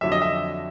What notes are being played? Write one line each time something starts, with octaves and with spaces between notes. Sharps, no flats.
F2 D3 F#3 E5
D#5
E5